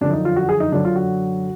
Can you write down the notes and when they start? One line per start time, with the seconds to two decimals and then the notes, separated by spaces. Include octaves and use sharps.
0.01 F#2 D3 F3 D4
0.13 D#4
0.25 F4
0.36 F#4
0.49 G#4
0.60 D#4
0.72 F#2 D3 F#3 D4
0.85 F4
0.96 F#4